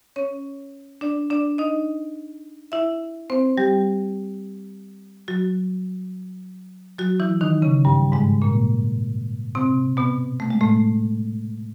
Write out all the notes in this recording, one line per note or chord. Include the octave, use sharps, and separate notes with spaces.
C#4 C#5
D4 D5
D4 D5
D#4 D#5
E4 E5
C4 C5
G3 G4
F#3 F#4
F#3 F#4
E3 E4
D#3 D#4
C#3 C#4
G2 G3
G#2 G#3
A#2 A#3
C3 C4
B2 B3
A3
G#3
A2 A3